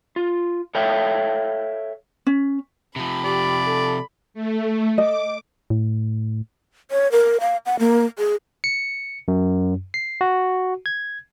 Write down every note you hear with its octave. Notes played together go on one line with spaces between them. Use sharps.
F4
A4 C#5 E5 F5 G5
C#4
C3 F3 B5
G4 D5
A4
A3
D#5 D6
A2
C#5
A#4
F5
F#5
A#3
G#4
C#7
F#2
C7
F#4
G#6